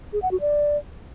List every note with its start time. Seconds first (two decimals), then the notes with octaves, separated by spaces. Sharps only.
0.13 G#4
0.22 F#5
0.31 F#4
0.41 D5